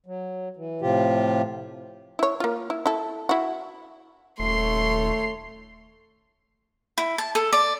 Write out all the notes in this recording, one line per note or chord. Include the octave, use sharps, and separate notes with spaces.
F#3
E3
A2 C3 F3 F4 G4
E4 C#5
A#3 F4
E4
E4 A4
E4 F#4
D#1 A3 C#5 C6 C7
E4
A5
A4
D5